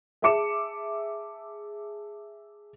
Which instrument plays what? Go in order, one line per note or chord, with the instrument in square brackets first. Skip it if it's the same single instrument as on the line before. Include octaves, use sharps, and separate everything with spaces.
[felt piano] G#4 E5 A5 D6 C#7 E7